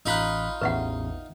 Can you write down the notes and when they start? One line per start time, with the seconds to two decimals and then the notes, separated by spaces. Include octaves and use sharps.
0.06 A1 D#4 F4 B5 F#6
0.61 A1 E2 B4 E5 F#5